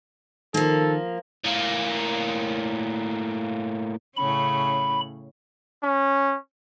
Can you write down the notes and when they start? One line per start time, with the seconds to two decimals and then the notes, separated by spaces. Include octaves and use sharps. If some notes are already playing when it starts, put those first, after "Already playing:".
0.54 D#3 F3 A#3 A4
1.45 A2 A#3
4.16 A2 C#3 C#4 B5
5.83 C#4